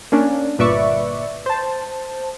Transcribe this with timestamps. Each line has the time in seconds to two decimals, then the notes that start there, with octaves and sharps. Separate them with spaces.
0.12 A#3 C#4 D4
0.59 G1 A#2 B4 D5 E5 C#6
1.46 C5 A5